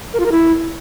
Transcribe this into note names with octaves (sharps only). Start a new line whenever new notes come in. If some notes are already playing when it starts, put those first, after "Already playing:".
A#4
F4
A#4
E4